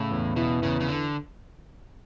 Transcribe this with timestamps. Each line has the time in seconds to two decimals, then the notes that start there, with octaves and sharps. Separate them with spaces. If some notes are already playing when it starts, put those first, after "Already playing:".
Already playing: A2 C#3
0.11 E2
0.36 B2 E3
0.62 E2 C#3
0.80 C#3
0.89 D3